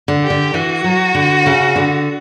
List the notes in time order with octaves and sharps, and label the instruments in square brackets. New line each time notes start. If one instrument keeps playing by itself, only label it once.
[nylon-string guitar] D3
[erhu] G4
[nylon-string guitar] D3
[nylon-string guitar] E3 [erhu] F#4
[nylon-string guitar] F#3
D3
C#3
D3